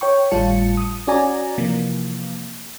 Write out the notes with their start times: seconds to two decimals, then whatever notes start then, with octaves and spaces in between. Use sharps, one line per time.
0.01 C#5 G5 C#6
0.31 G#1 A2 G3 F4 A5 C#7
0.77 D#6
1.07 C#4 F#4 D5 G#5 A#5
1.58 C3 E3 F3 A#3